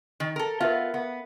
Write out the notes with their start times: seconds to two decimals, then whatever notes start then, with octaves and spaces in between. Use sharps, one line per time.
0.20 D#3
0.36 A4 A#4
0.60 B3 F4 A#4 E5 F5
0.94 B3